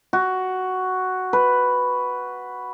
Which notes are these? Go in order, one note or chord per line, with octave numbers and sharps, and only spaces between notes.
F#4
B4